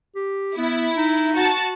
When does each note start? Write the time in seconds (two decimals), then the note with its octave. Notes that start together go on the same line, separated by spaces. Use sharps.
0.16 G4
0.58 B3 E4
0.96 D#4
1.36 F#4 A5